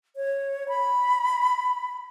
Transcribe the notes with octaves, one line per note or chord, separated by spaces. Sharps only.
C#5
B5